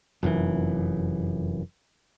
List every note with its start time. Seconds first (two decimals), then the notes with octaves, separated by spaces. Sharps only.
0.23 F1 F#2 A#2 E3